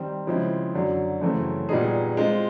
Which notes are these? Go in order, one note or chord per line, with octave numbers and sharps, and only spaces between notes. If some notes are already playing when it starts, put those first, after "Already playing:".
Already playing: D#3 G3 C4
C#3 F3 G#3 C4 E4
F#2 D3 F#3
F#2 C#3 E3 A3 C4
A#2 G3 B3 D#4 G#4
G#3 C4 F4